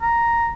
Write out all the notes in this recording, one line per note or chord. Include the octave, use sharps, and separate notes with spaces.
A#5